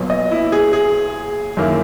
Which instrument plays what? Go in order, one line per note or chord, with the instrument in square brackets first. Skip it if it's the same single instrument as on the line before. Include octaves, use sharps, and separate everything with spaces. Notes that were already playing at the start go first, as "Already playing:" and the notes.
Already playing: [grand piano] B1 A#2 F#3 B3
[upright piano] D#5
E4
G#4
G#4
[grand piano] F#2 D#3 A#3 E4